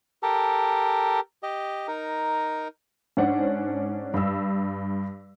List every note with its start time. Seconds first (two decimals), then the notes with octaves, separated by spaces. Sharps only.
0.23 G4 A4 A#4
1.43 G4 D#5
1.88 D#4 A#4
3.17 G#2 C#4 D4 C5 F#5
4.14 G2 E6